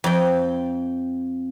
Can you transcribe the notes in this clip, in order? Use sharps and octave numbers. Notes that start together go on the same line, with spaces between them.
F2 G5